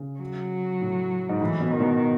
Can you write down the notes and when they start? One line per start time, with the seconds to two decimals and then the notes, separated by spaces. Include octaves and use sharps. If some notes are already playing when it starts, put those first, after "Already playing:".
Already playing: C#3
0.20 F#3
0.81 A2
1.29 G#2
1.41 A2 E3
1.61 B2
1.71 D#3
1.80 B2